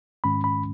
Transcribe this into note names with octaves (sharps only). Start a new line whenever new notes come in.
G#2 D#3 G#3 C#4 B5
B5